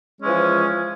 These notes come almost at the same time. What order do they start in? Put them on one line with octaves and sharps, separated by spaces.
G#3 C#4 E3 F3